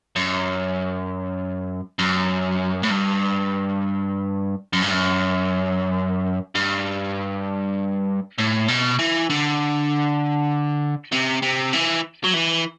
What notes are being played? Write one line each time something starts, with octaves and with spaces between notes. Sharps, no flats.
F#2
F#2
A2
G2
F#2
G2
F#2
G2
A2
B2
E3
D3
C3
C3
E3
F#3
E3